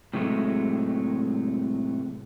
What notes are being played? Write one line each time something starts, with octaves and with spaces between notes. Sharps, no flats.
A2 C3 F#3 G#3 A3